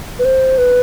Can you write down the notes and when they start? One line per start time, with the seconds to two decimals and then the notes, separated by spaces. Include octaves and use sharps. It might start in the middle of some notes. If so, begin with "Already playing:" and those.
0.19 B4
0.25 C5
0.58 B4